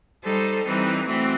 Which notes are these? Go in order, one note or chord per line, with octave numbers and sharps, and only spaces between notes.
G3 D#4 A4 C5
E3 G3 C4 D#4
E3 A3 C4 F#4